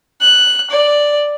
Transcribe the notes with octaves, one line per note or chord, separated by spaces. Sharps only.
F#6
D5